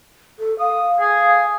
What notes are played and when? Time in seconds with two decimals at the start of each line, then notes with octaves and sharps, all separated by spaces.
0.39 A4
0.59 F5 D#6
1.00 G#4